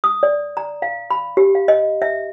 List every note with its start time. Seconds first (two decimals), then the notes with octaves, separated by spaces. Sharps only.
0.04 D#6
0.23 D5
0.57 A#5
0.82 F5
1.11 B5
1.37 G4
1.55 F5
1.68 D#5
2.02 E5